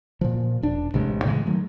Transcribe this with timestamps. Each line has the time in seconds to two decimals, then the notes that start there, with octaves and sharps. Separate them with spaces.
0.21 A#2 F3
0.62 E1 D4
0.94 A1 C3 G#3
1.24 A2 C#3 E3 G#3
1.46 D#3 F#3 A3